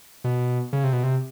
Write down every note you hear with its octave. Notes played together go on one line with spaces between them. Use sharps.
B2
C#3
C3
B2
C3